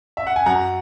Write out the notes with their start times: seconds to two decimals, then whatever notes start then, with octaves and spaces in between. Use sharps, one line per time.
0.17 E5
0.27 F#5
0.36 G#5
0.46 F#2 F#5 A#5